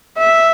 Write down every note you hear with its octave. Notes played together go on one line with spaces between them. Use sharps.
E5